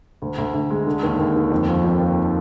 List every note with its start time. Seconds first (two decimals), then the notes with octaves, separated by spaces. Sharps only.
0.22 D2
0.38 D2
0.54 D2
0.70 G#3
0.87 D3
1.03 D#2
1.19 D#2
1.36 D#2
1.51 F2
1.68 F3
1.84 F2
2.01 A#3